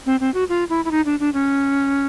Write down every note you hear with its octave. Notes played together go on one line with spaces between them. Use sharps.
C4
C4
F#4
F4
E4
E4
D#4
D4
D4
C#4